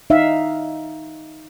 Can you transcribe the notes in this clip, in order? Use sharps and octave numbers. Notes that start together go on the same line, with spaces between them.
D#4 E5 F5